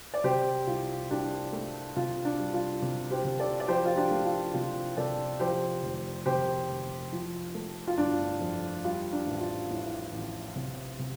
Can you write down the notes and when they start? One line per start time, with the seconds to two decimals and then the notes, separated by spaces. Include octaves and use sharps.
0.14 D5
0.24 C3 G4 C5
0.67 C2 F4
1.11 C2 D4 G4
1.53 A3
1.96 C3 F4
2.25 D4
2.39 G3
2.53 F4
2.82 C3
3.11 G4 C5
3.25 C3
3.39 A4 D5
3.60 D5
3.68 F3 G4 C5
3.85 F4
3.96 D4 G4
4.11 A3
4.25 F4
4.54 C3 F4
4.97 C3 A4 D5
5.40 F3 G4 C5
5.83 F1
6.26 C3 G4 C5
6.69 F1
7.12 F3
7.55 A3
7.87 F4
7.98 G1 D4
8.40 F2
8.84 G3 F4
9.13 D4
9.26 A1
9.41 F4
9.71 A2
10.12 A1
10.56 C3
10.99 C3